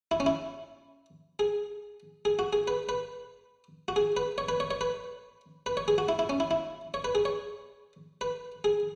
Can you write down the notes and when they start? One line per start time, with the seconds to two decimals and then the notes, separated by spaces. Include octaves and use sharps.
0.11 E4
0.20 C#4
0.26 E4
1.39 G#4
2.25 G#4
2.39 F#4
2.53 G#4
2.68 B4
2.89 B4
3.88 F#4
3.96 G#4
4.17 B4
4.38 C#5
4.49 B4
4.60 C#5
4.71 C#5
4.81 B4
5.66 B4
5.77 C#5
5.88 G#4
5.98 F#4
6.09 E4
6.19 E4
6.29 C#4
6.40 E4
6.51 E4
6.94 C#5
7.04 B4
7.15 G#4
7.25 C#5
8.21 B4
8.64 G#4